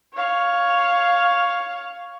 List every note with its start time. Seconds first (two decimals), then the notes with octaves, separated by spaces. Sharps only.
0.14 C#5 F5